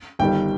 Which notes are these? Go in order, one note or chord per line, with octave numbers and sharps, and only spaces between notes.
G1 G2 D#3 G3 G5